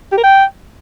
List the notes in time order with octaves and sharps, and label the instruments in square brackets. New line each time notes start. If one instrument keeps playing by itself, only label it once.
[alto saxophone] G4
A#4
G5